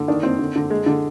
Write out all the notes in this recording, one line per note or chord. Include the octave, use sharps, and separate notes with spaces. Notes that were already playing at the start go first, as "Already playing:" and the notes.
Already playing: D3
D#3 D4
D#3 C4
D3
D3
G#3
D3